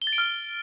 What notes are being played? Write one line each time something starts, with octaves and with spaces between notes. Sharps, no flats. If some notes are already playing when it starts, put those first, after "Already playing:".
G7
A6
D7
F6